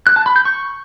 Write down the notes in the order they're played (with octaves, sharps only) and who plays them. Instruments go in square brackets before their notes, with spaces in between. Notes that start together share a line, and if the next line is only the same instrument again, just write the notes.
[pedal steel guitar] F#6
A5
B5
G6
C#6